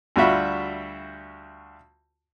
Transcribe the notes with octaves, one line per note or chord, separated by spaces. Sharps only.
D2 G3 F4 F#4 E5 B5